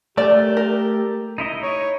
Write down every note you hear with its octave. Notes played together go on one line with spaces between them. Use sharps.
A3 G4 A#4 D5
A#4
D#4 E4 D#5
C#5